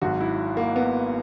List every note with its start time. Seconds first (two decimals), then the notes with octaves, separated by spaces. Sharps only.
0.02 G#1 G#2 F#3 F#4
0.21 E4
0.57 A#3
0.76 B3